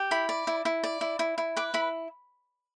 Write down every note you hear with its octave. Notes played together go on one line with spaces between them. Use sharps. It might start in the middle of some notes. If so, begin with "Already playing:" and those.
Already playing: G4
E4 B5
D5
E4
E4
D5
E4
E4
E4
B4 D6
E4 B5